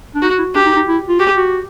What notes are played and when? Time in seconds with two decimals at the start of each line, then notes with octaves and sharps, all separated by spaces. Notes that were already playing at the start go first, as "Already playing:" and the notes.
0.15 D4
0.22 D#4 F#4
0.38 E4
0.55 D4 G4
0.66 D#4
0.76 D#4
0.87 E4
1.09 F4
1.19 F#4 G4
1.36 F#4